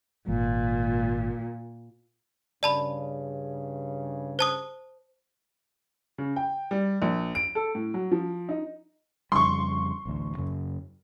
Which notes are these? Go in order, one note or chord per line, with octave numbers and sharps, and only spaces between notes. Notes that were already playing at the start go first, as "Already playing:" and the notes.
G#1 A#2
G2 C#3 D5 A5 B5
C5 A5 D#6
C#3
G5
G3
A#1
D7
A4
A2
F#3
F3
D#4
F2 C#3 G3 C6 C#6
A1 D2
F#2 C#3